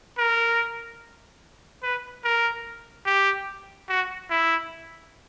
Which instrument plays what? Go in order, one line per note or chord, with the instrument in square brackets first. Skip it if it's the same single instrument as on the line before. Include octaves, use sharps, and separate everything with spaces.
[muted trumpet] A#4
B4
A#4
G4
F#4
E4